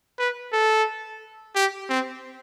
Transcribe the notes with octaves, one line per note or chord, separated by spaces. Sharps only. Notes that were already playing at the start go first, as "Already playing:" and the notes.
B4
A4
G4
C4